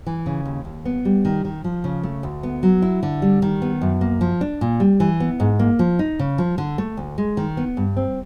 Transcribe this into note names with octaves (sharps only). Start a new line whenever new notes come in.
E3
C#3
D#2
D#2
B3
G3
D#3
D#3
F3
C#3
A3
D2
B3
F#3
E4
D3
G3
D#3
B3
F#2
A#3
F3
D4
A#2
G3
E3
B3
G#2
A#3
F3
D#4
C#3
F3
D3
A3
D2
G#3
D#3
B3
G2
C4